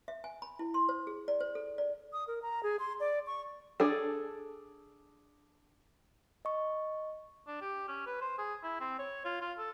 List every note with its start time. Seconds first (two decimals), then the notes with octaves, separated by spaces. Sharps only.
0.08 E5
0.24 G#5
0.42 B5
0.59 E4
0.74 C6
0.89 C5
1.07 G#4
1.28 D5
1.40 C5
1.55 A4
1.78 D5
2.13 D#6
2.28 A#4
2.42 A#5
2.63 G#4
2.79 C6
3.00 D5
3.27 C#6
3.80 D4 G#4 A4
6.45 D#5 C#6
7.47 D4
7.61 G4
7.88 C#4
8.06 B4
8.21 C5
8.38 G#4
8.63 E4
8.80 C4
8.99 C#5
9.25 F4
9.41 F4
9.58 A4